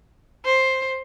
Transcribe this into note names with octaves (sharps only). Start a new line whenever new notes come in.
C5